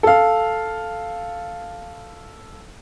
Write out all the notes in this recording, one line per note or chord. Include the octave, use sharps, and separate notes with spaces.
A4 F5